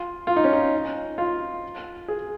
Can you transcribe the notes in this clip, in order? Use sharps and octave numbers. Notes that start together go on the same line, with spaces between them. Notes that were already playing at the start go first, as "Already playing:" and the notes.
Already playing: F4
F4
D#4
C#4
D#4
F4
G#4